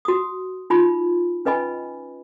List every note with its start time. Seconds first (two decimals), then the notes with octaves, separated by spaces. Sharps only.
0.05 F#4 D#6
0.70 D#4 F4 B5
1.45 C#4 B4 D#5 G#5 B5